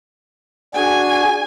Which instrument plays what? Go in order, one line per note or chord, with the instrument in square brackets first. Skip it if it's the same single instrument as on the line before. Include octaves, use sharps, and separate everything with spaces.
[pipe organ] D4 F#4 G#4 [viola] G#5